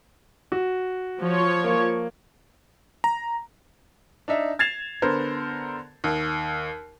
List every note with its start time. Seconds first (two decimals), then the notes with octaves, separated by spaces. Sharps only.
0.52 F#4
1.20 F3 C#5
1.64 A#3
3.04 A#5
4.28 D4 D#4 E5
4.59 G#6 A6 C7 E7 F7
5.02 D3 B3 A#4 C5
6.04 D#2